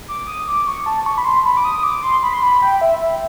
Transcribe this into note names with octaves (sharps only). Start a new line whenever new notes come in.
D6
D#6
D6
C#6
A5
C#6
B5
C6
B5
D6
D#6
D#6
D6
C6
B5
C6
B5
G5
E5
E5